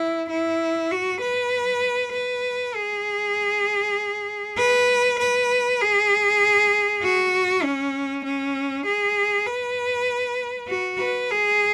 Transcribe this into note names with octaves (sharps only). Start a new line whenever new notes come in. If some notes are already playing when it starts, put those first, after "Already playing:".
Already playing: E4
E4
F#4
B4
B4
G#4
B4
B4
G#4
F#4
C#4
C#4
G#4
B4
F#4
B4
G#4